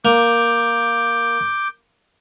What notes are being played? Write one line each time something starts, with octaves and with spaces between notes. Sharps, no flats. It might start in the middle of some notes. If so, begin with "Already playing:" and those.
A#3 D6 G6